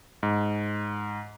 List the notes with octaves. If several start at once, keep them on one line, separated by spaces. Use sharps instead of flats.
G#2